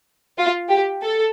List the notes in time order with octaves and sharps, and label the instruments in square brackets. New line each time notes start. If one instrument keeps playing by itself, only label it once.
[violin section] F4
G4
A4